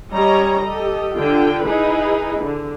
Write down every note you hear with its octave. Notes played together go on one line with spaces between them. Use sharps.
G3 C#4 C#5 D#5 A#5
G4 A4 D#5
D3 F4 G5
D#4 E4 G#4 B4
D3